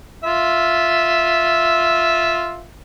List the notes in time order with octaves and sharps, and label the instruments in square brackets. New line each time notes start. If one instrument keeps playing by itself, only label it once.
[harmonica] F4 E5